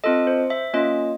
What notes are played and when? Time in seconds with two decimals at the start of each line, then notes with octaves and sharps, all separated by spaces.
0.04 C4 F4 A4 D#5
0.27 C5
0.50 E5
0.74 A#3 C#4 F4 D#5